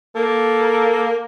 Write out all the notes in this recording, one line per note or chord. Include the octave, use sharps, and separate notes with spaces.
A#3 A4
A#4